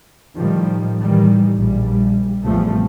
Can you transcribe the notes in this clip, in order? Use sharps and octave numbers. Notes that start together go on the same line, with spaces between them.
A2 D#3 F3 G3
A2 D#3 E3 G3
A#1 G3
A1 E2 C3 F3 G3 A3